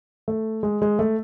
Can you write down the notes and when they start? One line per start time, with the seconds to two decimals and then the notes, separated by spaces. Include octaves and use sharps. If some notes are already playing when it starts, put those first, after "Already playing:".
0.28 A3
0.63 G#3
0.82 G#3
0.99 A3